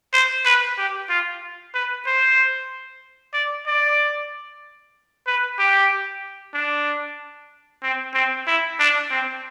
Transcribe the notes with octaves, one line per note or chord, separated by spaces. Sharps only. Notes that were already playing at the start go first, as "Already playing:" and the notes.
C5
B4
G4
F4
B4
C5
D5
D5
B4
G4
D4
C4
C4
E4
D4
C4